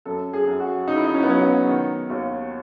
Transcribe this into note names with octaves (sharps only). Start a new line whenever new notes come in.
F#2 A4
G#4
F#2
F#4
C#3 D#4
E4
D#4
C#4
B3
F#3 C#4
B3
D#3
D#2